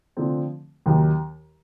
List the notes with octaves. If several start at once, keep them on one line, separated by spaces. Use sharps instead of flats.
D3 F3 A3 C4
D#2 D#3 F#3